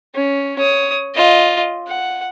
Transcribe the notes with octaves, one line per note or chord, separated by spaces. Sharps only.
C#4
C#5 D#6
F4 D#5
F#5